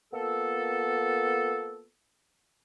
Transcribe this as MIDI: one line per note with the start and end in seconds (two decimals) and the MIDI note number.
0.13 1.88 58
0.13 1.88 59
0.13 1.88 65
0.13 1.88 69